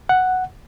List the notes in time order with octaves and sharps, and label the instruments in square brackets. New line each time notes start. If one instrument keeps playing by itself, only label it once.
[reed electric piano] F#5